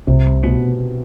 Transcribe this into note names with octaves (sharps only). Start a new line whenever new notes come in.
C2 C3
C2
B2 B3